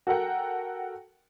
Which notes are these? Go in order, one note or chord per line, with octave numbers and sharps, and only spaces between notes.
F#4 A4 A#4 F#5 G5